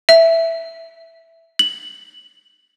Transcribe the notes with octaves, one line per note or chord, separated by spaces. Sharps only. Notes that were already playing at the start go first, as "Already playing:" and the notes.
E5
F#7